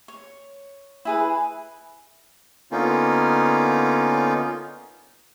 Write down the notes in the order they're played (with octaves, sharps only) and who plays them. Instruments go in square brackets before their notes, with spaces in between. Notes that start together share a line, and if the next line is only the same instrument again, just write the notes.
[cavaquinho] C#5
E4 G#4 B4
[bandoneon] D3 A#3 B3 C#4 D#4 F4